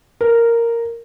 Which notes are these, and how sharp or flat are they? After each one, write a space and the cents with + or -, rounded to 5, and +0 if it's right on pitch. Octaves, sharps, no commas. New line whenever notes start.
A#4 -5